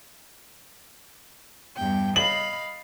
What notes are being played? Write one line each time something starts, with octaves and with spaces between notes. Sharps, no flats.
E2 G2 G5
D#5 F5 B5 F#7